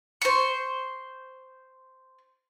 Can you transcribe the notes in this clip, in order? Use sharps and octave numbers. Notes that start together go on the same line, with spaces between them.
C5 C#6